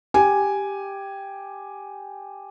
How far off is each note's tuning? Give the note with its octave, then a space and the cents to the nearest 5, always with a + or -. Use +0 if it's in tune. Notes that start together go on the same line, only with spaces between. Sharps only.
G4 +5 G#5 +0